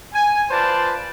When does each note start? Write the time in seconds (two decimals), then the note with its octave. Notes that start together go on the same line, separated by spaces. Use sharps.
0.13 G#5
0.51 F4 B4 C5 D5 A5